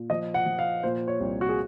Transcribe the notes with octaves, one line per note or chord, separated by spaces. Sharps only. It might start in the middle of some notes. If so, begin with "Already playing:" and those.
Already playing: A#2
F3 D#5
F#5
F3
F5
A#2 C5
C#5
C2
F#4
G#4